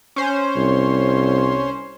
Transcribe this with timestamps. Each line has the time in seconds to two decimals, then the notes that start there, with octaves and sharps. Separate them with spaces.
0.16 C#4 C5
0.56 C2